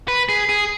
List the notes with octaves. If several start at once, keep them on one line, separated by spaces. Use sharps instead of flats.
B4
G#4
G#4